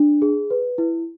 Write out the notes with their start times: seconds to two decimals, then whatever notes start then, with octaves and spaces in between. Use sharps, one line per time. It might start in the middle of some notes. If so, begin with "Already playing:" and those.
Already playing: D4
0.22 G#4
0.50 B4
0.78 E4